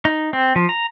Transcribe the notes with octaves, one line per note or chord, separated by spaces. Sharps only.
D#4
C4
F3
A#5